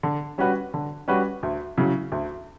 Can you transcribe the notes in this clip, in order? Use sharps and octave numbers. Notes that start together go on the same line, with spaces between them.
D3
G3 C#4 F#4 B4
D3
G3 C#4 F#4 B4
D2
C#3 F#3 C#4 E4
D2